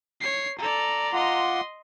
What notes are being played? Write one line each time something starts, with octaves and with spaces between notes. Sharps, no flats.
C#5 C7
A4 D5 A#5
F4 D#5 F#5 C6 D6